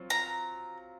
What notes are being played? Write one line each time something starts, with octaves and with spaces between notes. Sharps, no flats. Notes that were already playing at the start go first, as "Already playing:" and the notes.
Already playing: F#3 C4 F4
A#5